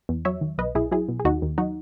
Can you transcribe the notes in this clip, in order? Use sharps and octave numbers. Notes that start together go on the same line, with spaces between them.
E2
F#3 C#5 E5
D#3
B1 B4 D#5
B1 E4 G#4
F#3 E4 G#4
B2
G#4
D#2 D#4 F#4
D#2
F#3 D#4 F#4